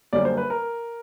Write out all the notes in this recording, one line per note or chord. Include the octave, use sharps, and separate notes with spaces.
F#2 D3 G3 A#3 C#4 D5
C5
B4
A#4